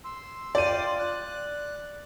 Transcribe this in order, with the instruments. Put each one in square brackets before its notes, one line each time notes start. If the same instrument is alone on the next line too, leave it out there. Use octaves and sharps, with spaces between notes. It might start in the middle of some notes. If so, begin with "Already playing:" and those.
[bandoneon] C6 E6
[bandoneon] F4 G5 C6 [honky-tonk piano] D5 D#7
[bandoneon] F#6